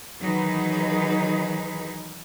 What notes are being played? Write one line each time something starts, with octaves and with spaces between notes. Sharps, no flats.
D#3 E3 F#3 D#4 G#4 B4